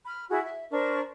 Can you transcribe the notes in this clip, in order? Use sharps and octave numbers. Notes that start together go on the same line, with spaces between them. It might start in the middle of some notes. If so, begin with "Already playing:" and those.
B5 F6
E4 F#4 G#4
E5
D4 A#4 C5 C#6